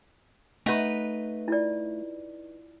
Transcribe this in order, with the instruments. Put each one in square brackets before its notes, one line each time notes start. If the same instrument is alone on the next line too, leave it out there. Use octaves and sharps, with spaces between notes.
[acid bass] A3 [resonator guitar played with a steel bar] D#4 B4 [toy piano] F#5
[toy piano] E4 F4 D5